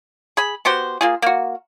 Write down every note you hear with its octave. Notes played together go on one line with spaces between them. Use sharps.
G#4 B5
B3 F#4 G4 C5
A#3 F4 G#4
A#3 F#4